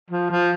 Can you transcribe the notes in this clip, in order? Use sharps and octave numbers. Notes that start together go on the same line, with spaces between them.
F3
F3